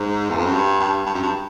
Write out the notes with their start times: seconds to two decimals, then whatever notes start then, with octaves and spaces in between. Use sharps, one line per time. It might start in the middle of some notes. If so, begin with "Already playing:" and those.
Already playing: G#2
0.30 E2
0.37 F2
0.45 F#2
0.53 G2
0.80 G2
1.06 G2
1.14 F#2
1.23 G2